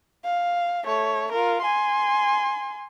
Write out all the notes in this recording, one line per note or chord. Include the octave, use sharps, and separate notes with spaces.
F5
A3 C#5
F4 A#4
G#5 C6